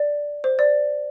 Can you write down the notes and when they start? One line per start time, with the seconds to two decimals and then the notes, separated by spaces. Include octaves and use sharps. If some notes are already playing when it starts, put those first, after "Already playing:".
Already playing: D5
0.44 C5
0.59 D5